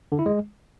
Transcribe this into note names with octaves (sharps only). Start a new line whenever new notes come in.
D3
E4
G#3